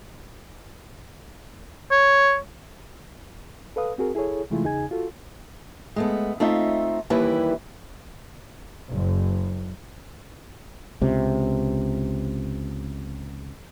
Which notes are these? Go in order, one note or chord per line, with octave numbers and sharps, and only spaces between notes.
C#5
A4 B4 F5 D#6
C4 F#4 G#4 A#4
E4 G#4 A4 C#5
C3 E3 G#3 A3 E4 F4
E2 C#3 D#4 G#4 G#5 G#6
F4 F#4 A4
G#3 A3 B3
A3 C4 D#4 F4 E5
D#2 E3 G3 E4 B4
F#1
C#2 C3